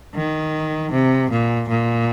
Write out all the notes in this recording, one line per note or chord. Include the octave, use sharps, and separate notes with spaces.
D#3
C3
A#2
A#2